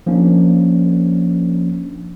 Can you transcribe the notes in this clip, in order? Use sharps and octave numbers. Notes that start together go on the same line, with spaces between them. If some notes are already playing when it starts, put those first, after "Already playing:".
F3 A#3 C#4 D4